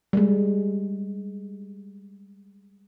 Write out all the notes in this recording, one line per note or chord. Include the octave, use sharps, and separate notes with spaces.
G3 G#3